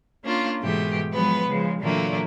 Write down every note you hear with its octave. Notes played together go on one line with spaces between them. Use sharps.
A#3 C#4 D4 F4
G#2 B2 E3 G#3 A3 G4
F3 F#3 G#3 B3 B4
C#3 F3 G#3
A#2 D3 E3 F#3 A3 A#3